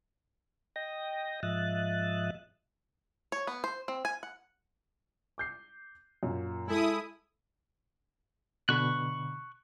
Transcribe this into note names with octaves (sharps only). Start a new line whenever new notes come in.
D#5 G5 A#6
G#2 F3 D#5 E5 F#6 A6
C#5
B3
C5
C4
G#5
F#5
D6 G6 C7
F#2 A#2
G#3 E4 A4 D#6
B2 D3 B5 C#6 F#6